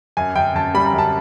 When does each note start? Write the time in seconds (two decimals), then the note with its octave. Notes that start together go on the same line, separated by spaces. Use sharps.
0.17 F#2 G#5
0.35 F#2 G5
0.55 F#2 A5
0.74 G3 B5
0.86 A#5
0.93 F#2
0.98 A5